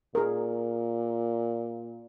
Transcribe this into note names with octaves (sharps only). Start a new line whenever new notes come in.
A#2 G#4 A#4